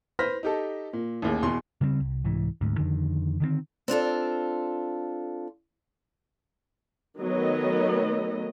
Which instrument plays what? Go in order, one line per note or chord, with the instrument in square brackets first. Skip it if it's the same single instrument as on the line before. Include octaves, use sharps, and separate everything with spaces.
[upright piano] B4 C5 F6 A#6 B6
D#4 G4 A4
A#2
A1 D#2 G#4
E2 B2 C6
[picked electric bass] C#3 G3 B3 C4
C2
C2 G#2 E3
D2 G#2
F2 D3 D#3
D3 D#3 G3 C4
[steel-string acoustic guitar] C4 D4 F4 A4
[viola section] D#3 F#3 A3 B3 D#5